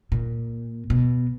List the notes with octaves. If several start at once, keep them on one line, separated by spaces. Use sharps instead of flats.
A#2
B2